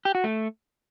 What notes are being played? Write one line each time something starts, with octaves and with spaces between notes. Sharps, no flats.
G4
F#4
A3